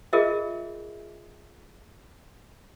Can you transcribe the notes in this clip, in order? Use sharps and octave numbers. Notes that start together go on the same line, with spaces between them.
F4 G#4 A#4 D#5 E5